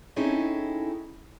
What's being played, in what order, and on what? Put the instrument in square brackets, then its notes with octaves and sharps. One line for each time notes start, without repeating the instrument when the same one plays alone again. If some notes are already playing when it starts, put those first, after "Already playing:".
[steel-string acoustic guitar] C4 C#4 D#4 E4 G#4 A4